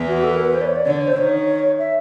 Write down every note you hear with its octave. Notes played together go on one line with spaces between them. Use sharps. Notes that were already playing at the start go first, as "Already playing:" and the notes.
Already playing: E2 E3
F#4
A4
A#4
B4
C5
D5
C#5
D5
D3 C#5
D5
C#5
C5
D#3 C#5
E5